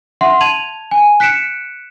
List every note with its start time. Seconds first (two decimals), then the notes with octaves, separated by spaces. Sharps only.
0.21 E5 F#5 C6
0.41 A5 G#6 D#7 F7 F#7
0.91 G#5
1.20 F#6 B6 C#7 D7 E7